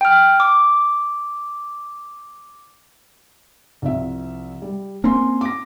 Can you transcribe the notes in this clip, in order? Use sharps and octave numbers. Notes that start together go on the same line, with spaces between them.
G5 F6
D6
C2 F3 E5
G3
A#3 C4 C#4 G#5 C6
D6 A#6